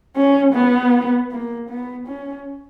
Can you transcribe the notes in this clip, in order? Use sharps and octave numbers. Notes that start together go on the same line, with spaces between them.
C#4
B3
A#3
B3
C#4